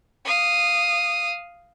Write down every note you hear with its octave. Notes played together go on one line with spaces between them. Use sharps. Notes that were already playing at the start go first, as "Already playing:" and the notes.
F5 D#6